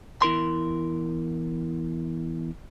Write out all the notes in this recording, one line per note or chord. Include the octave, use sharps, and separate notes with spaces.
E2 E4 A#4 C6